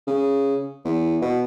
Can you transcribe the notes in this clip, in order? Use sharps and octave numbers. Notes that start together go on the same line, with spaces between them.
C#3
E2
B2